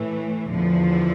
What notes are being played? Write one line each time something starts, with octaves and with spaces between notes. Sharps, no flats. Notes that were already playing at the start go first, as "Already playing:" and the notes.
Already playing: A2 E3 A3
E2 D3 F3